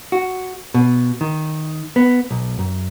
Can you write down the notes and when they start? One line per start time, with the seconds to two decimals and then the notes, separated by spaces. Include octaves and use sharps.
0.12 F#4
0.74 B2
1.21 D#3
1.96 B3
2.31 B1
2.59 F#2